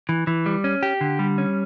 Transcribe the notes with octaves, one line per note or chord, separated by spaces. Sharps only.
E3
E3
G3
C#4
G4
D3
G3
C#4